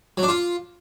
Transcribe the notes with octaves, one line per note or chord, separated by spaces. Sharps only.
F#3
D4
F4